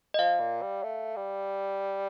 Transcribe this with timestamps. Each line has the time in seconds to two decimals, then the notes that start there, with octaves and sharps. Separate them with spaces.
0.14 D#5
0.19 F3 F5
0.40 A#2
0.62 G3
0.83 A3
1.16 G3